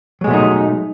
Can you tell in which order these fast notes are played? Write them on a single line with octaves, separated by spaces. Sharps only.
F#3 G#3 B2 A3 D#4